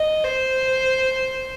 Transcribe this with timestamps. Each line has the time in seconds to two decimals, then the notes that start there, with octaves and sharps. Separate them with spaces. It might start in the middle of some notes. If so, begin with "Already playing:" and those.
Already playing: D#5
0.24 C5